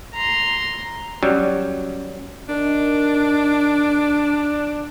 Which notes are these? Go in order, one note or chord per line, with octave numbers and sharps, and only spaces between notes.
A#5 C6
F#3 G3 C#4
D#3 D4